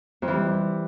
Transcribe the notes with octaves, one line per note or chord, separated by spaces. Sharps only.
F2
E3
G3